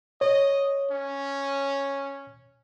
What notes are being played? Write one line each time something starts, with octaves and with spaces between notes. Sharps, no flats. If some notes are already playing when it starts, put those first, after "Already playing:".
C#5 D#5
C#4